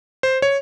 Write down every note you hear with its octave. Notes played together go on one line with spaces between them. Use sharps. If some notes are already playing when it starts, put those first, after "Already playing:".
C5
C#5